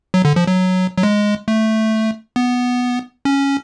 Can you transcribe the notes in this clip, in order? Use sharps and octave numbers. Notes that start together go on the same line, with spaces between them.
F#3
D3
F3
F#3
F#3
G#3
A3
B3
C#4